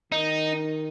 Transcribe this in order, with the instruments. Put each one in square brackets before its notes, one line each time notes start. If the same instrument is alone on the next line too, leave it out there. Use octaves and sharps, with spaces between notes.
[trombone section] D#3 [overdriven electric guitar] D#4